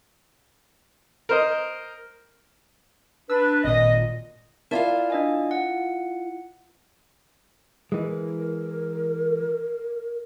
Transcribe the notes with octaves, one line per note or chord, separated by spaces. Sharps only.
A#4 C5 D#5
D4 B4 E6
G#1 A#2 D#5
E4 F4 A#4 D5 F5 A5
D4 D#5 G#5
F#5
E3 G#3 A#4